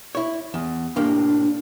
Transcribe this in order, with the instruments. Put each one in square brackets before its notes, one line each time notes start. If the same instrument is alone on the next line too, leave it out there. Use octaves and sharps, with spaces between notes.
[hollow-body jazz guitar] E4 C#5
E2
[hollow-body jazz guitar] A2 C3 A#3 [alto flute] D4